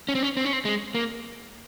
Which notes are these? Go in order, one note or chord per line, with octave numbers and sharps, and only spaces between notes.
C#4
C4
C#4
C4
C#4
C4
G#3
A#3